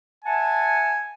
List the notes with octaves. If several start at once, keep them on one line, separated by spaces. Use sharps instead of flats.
E5 F#5 G#5 A5